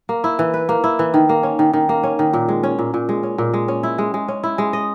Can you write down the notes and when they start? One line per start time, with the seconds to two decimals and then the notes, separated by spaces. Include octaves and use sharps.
0.09 A#3
0.24 E4
0.39 E3
0.54 B4
0.69 A#3
0.84 E4
0.99 E3
1.14 D#3
1.29 A#3
1.43 C#4
1.59 D#3
1.73 D#3
1.89 A#3
2.03 C#4
2.19 D#3
2.33 A#2
2.49 G#3
2.63 C#4
2.79 A#2
2.94 A#2
3.09 G#3
3.23 C#4
3.38 A#2
3.54 G#3
3.68 C#4
3.83 E4
3.98 G#3
4.14 G#3
4.28 C#4
4.44 E4
4.58 G#3
4.73 D#5